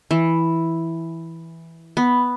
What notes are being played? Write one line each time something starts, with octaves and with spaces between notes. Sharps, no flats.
E3
B3